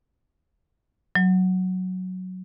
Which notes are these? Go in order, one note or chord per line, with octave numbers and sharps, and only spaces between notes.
F#3